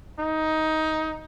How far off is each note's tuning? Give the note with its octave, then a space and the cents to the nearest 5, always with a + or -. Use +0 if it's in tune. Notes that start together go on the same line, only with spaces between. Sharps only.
D#4 +15